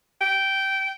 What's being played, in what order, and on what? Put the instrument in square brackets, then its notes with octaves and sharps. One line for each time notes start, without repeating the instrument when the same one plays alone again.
[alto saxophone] G5